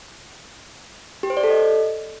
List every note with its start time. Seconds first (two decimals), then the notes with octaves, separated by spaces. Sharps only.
1.23 G4
1.30 C5
1.37 D5
1.44 A4
1.50 D#5